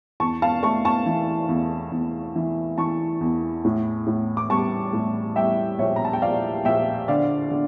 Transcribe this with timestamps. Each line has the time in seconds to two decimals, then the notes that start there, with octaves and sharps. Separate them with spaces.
0.20 E2 A5 C#6
0.42 F5 A5
0.63 A3 A5 C#6
0.85 A5 C#6
1.06 E3
1.49 E2
1.92 E2
2.36 E3
2.78 E3 A5 C#6
3.21 E2
3.65 A2
4.07 A2
4.37 D6
4.50 G3 A5 C#6
4.93 A2
5.36 G3 E5 G5
5.79 A#1 C#5 E5
5.96 A#5
6.05 A5
6.13 G5
6.22 A#1 D5 F5
6.65 A#1 E5 G5
7.08 D3 D5 F5
7.51 D3